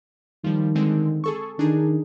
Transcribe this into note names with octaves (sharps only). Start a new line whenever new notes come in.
D#3 F3 G3
D3 G#3 C4
G#4 A4 C#6
D#3 D4 D#4 G#4